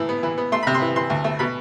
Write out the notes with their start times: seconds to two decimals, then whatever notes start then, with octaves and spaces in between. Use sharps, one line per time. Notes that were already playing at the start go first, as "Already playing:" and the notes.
Already playing: A2 E3
0.09 B3
0.23 E3
0.38 B3
0.52 A3 C6
0.63 B5
0.67 C3
0.74 C6
0.81 E3
0.96 E3 C6
1.10 D2
1.24 A3
1.39 B2 B5